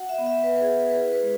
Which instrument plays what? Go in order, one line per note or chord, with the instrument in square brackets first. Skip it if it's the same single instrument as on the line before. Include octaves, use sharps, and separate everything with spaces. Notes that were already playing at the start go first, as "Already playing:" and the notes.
Already playing: [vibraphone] F#4 F#5
E5
B3
E5
B3 B4
B4
G#4
F#4
B4
E4 G#4
B4
G#3